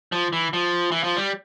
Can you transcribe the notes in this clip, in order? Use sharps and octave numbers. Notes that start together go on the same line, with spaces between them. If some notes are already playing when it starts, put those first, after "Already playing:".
F3
E3
F3
E3
F3
G3